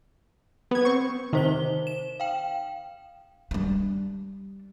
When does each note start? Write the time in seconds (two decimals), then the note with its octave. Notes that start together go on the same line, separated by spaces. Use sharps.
0.71 B3 G#6
0.85 C4 C#6
1.33 C3 D#3 D#4 C5 G7
1.87 E7
2.20 F5 G5
3.51 G3 D4